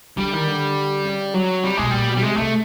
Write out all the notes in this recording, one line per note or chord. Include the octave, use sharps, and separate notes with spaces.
D3 G3
D#3
D3
C#3
F#3
C3 G3
B2 G#3
A#2 G3
B2
G3
C3 G#3
C3 A3